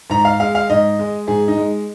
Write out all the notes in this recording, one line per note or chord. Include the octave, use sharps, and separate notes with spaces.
G#2 A#5
F5
G#3 F5
F5
G#2 D#5
G#3
G#2 G#4
D#4
G#3